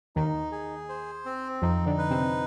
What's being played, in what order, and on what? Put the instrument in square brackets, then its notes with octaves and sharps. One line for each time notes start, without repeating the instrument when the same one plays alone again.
[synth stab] D#2 D#3 [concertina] D#4
[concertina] G#4
C5
C4
[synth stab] F2 F3 [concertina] D#4
[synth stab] D3 D4
[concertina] B4
[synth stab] C3 C4